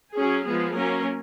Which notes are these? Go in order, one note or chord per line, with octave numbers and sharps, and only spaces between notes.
F#3 C#4 G#4
F3 G#3 B3 G#4
F#3 A#3 C#4 A#4